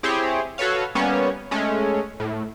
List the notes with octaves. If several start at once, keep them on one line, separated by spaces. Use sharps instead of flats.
C4 E4 G4 G#4 C5 C#5
F#4 A4 B4 C#5 F5
G3 A#3 B3 C#4 C#5
G#3 A3 C#4
A2